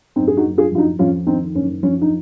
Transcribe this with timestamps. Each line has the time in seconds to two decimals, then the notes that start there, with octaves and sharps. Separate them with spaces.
0.16 F#1 C4 D#4
0.28 G#4
0.37 D#4 F#4
0.44 F#1
0.58 F4 G#4
0.71 F2 F4
0.78 D#4 F#4
0.99 F2 C#4 F4
1.26 D#3 C4 D#4
1.55 F#1 C#4
1.83 F3 C#4
2.01 D#4